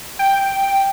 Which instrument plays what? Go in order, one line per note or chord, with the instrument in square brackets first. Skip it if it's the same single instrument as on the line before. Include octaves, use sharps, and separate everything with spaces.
[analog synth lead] G5